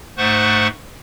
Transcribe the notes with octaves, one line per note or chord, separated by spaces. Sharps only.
G#2 A3 C5 F#5 C#6 F#6